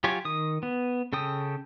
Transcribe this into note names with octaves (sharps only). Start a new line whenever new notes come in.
F#3 F4 G4 C#5 G#5
D#3 D#6
B3
C#3 A4 G5 D#6